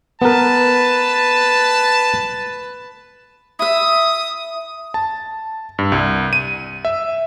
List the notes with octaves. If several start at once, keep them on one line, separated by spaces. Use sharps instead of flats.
B3 A#4 B4 A5
E4 E5 D#6
A5
G2
C2
D#7
E5